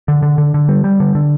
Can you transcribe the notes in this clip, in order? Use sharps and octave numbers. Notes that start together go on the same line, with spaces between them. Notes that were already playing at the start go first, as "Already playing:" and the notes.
D3
D3
D3
D3
G3
G3
D3
D3